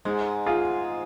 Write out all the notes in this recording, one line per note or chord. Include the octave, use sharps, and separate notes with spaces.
G#2 G#3
F4 G#4